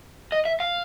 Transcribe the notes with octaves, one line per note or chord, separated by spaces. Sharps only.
D#5
E5
F5